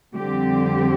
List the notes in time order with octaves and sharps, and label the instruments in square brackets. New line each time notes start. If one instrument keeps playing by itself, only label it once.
[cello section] F2 D3 G3 C4 G4